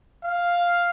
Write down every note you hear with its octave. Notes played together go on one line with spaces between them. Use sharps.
F5